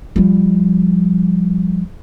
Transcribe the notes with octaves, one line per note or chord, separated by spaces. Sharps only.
F3 G3